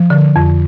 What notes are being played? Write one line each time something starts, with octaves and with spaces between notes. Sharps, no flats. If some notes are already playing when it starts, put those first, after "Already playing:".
Already playing: F3
D3
F2